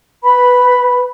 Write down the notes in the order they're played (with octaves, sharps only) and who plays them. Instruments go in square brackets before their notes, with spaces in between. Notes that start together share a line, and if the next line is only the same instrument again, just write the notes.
[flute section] B4 B5